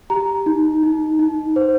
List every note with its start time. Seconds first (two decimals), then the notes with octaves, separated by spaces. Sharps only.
0.10 G4 A#5
0.46 D#4
0.83 D#4
1.19 D#4
1.56 C5